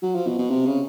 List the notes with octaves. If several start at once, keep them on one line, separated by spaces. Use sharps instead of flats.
F#3
F3
B2
B2
C3
C#3